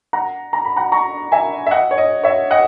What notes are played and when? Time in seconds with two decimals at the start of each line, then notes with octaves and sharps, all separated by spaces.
0.13 F#5 A#5
0.53 A#5
0.65 B5
0.76 F#5 A#5
0.92 A#5 C#6
1.32 E5 G#5
1.67 E5
1.71 D#5 F#5
1.91 C#5
1.98 D#5
2.23 C#5 E5
2.51 D#5 F#5